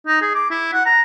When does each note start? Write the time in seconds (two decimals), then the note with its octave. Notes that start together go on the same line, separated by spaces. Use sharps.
0.07 D#4
0.21 G#4
0.35 D6
0.51 E4
0.73 F#5
0.86 A#5